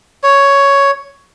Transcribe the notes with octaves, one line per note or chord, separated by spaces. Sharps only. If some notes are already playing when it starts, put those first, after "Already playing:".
C#5